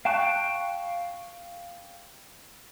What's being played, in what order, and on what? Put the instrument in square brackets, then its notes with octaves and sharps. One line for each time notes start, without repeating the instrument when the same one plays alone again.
[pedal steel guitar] F5 G5 A5 C#6 F#6